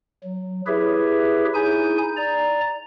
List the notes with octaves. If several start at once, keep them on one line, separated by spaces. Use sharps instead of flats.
F#3
E4 G4 G#4 B4 C#5 E5
D#4 E4 G#4 G#5 G6
D5 A#5